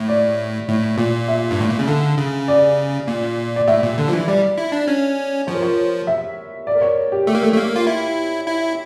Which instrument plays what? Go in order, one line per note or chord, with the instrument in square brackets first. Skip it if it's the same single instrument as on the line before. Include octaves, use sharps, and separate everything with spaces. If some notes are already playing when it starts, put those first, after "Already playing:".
Already playing: [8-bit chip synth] A2
[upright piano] D5
[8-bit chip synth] A2
A#2
[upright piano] E5
[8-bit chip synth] G2
A2
A#2
C#3
D3
C#3
[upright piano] D5
[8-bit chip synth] A#2
[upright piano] D5
[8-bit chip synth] A2 [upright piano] E5
[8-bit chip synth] A#2
D3
F3
E3
[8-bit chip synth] G3 [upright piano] D5
[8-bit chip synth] E4
D4
C#4
[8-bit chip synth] F3 [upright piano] C#5
[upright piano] A#4
C#5
E5
D5
A#4
C#5
G4
[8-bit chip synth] A3 [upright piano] G4
[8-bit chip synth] A#3
A3
A3
A#3
F4
E4
E4